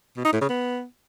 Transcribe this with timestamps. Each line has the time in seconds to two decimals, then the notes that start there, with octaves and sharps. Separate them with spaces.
0.16 B2
0.25 D#4
0.33 A2
0.41 C#3
0.49 B3